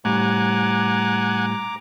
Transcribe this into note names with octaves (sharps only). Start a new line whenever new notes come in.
A2 G3 F#5 G#5 A#5 D6